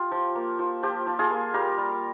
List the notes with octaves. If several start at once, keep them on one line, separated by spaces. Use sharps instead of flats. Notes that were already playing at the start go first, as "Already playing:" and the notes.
Already playing: F4 G4
F3
A#3
F3
F3 G4
F3
F4 G#4
A#3
G3 G4 A#4
G3